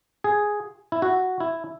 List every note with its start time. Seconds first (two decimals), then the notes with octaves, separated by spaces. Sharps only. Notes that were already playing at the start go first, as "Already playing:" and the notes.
0.24 G#4
0.92 E4
1.02 F#4
1.40 E4